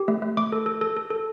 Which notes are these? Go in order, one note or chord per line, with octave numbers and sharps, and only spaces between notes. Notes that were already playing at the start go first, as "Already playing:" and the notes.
Already playing: G4
A3
A3
A3 D6
A4
A4
A4
A4
A4